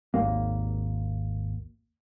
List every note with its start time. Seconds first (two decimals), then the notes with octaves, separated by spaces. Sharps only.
0.14 G#1 D#2 A#3